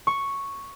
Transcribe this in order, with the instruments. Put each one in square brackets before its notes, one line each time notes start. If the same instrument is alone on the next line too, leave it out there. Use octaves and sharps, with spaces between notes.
[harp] C#6